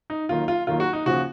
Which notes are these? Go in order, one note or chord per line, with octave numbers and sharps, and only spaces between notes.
D#4
D#2 D#3 F#3 F4
F4
D#2 D#3 F#3 F4
F#4
D#4
D#2 C#3 F3 F#4